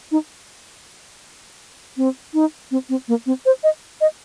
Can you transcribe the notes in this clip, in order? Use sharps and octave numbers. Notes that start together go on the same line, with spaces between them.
D#4
C4
D#4
C4
C4
A#3
C4
C5
D#5
D#5